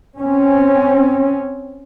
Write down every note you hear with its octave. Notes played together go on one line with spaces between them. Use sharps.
C4 C#4